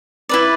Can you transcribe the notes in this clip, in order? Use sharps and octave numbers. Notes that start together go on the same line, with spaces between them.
E4 B4 D5